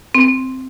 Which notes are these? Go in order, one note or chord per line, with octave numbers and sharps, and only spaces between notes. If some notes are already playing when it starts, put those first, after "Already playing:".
C4